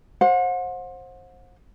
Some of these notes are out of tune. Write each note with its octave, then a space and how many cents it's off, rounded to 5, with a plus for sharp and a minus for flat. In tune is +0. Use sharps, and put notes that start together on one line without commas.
C5 +25 F#5 -40